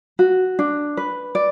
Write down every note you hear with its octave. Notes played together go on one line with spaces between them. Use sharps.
F#4
D4
B4
D5